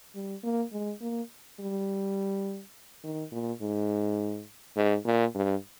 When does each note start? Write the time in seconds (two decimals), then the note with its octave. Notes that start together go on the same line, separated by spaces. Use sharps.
0.15 G3
0.43 A#3
0.72 G#3
1.01 A#3
1.60 G3
3.04 D#3
3.32 A#2
3.62 G#2
4.76 G#2
5.05 A#2
5.35 G2